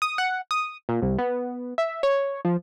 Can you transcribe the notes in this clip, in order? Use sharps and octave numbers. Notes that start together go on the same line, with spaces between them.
D#6
F#5
D#6
A#2
C2
B3
E5
C#5
F3